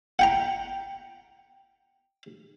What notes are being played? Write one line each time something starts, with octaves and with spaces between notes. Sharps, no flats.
F#5 G5 A#5